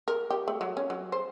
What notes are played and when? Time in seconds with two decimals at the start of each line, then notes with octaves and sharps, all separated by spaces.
0.08 A#4
0.30 G4
0.48 A3
0.61 F#3
0.77 C#4
0.90 F#3
1.12 C5